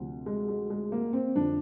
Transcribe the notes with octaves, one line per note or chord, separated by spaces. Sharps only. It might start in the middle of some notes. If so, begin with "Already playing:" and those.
Already playing: D2 C3 F3
G#3
G#3
G#3
A#3
C4
F2 D3 F3 D4